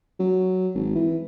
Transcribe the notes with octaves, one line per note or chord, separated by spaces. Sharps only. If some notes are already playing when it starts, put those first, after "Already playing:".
F#3
G#1
E3